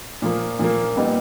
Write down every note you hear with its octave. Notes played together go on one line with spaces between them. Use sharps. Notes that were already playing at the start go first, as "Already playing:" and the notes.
A#2 F3 A#3
A#2 F3 A#3
A#2 G3 B3 D#4